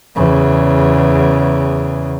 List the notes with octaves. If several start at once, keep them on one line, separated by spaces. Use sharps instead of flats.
E2 C#3